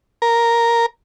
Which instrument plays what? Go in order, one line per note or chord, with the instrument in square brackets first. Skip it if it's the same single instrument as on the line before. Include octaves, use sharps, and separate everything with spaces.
[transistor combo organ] A#4